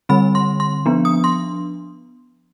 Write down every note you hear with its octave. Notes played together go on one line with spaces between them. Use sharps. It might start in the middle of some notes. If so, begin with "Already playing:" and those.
D3 G3 C4 B5
C6
C6
F3 B3 D4
D#6
C6